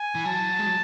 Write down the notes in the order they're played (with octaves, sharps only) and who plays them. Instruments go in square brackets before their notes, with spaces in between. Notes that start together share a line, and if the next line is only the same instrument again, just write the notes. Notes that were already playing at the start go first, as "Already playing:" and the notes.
Already playing: [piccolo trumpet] G#5
[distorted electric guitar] E3
[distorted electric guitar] F#3 [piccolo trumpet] A5
[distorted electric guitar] G#3
F#3